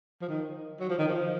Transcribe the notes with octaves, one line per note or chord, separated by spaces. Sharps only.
F3
D#3
F#3
F3
D#3
F3